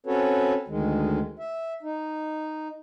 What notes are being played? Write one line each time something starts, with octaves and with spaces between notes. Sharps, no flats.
C4 C#4 F#4 A4 B4 C#5
D2 D#3 G#3
E5
D#4